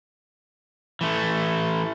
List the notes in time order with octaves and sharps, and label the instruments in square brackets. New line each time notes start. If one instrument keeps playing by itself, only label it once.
[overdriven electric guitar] E3 A3